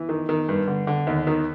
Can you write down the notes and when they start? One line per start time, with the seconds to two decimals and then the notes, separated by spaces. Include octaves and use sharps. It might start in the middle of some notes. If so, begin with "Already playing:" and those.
Already playing: E3
0.09 D#3
0.29 D#3
0.49 G2
0.68 D3
0.87 D3
1.07 D#2
1.27 D#3